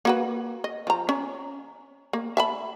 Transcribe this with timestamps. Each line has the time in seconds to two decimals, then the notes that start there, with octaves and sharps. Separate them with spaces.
0.05 A#3 F#4 B4
0.64 D#5
0.87 F3 A#5
1.09 C#4
2.13 A#3
2.37 E5 A5 B5